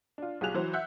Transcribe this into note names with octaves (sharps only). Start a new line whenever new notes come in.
D4 F4
B1 F4 G4 G#4 F#6 F7
E3 F#3 C5
E5 F#5 F#6 G6